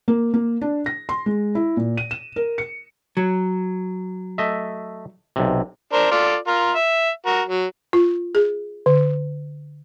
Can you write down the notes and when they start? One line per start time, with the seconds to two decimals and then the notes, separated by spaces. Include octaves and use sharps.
0.08 A#3
0.34 A#3
0.61 D4
0.86 A#6
1.09 C6
1.26 G#3
1.55 E4
1.77 A#2
1.97 D#7
2.11 E7
2.36 A#4
2.58 C#7
3.17 F#3
4.38 A3 D#5 E5
5.36 B1 C3
5.93 D4 A#4 C5
6.11 F4 A4 D5
6.47 F4 A#4
6.75 E5
7.26 F#4 A#4
7.48 F#3
7.93 F4
8.35 G#4
8.86 D3